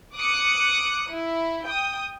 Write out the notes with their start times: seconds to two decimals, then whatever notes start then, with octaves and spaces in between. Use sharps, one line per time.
0.15 D6 D#6 F#6 C#7
1.09 E4
1.66 G5 D#6